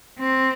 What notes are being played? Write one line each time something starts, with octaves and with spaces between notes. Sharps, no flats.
C4